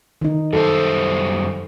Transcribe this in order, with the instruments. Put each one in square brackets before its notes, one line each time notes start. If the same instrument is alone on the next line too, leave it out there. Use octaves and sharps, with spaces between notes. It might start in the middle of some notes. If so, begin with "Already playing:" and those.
[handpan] D#3 D#4
[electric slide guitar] F#2 G3 C5 [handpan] A4